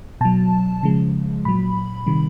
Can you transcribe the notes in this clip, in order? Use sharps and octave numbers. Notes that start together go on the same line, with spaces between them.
B2 F#3 A5
C#3 F3 G#3
A#2 F#3 B5
C3 D#3 G3